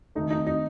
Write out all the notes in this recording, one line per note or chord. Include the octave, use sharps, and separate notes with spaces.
D#3 A3 D#4
D#4
D#4